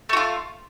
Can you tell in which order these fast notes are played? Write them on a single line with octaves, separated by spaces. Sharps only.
A3 F#4 F4